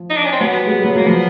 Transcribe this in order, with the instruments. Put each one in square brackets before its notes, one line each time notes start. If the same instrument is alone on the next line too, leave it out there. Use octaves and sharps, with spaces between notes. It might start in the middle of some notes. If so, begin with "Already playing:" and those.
Already playing: [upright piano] F3
[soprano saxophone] D#4
D4
C#4
C4
[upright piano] F#3 [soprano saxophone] B3
[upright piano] G#3
G3
F#3
[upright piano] F#3 [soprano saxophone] A#3
[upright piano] F3 [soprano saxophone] B3